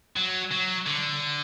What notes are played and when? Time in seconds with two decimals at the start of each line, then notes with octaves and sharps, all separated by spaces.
0.16 F#3
0.52 F#3
0.87 D3